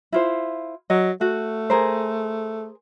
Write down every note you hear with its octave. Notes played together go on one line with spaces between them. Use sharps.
E4 F4 C5
F#3 D#5
A3 F#4
G#4 A#4 C5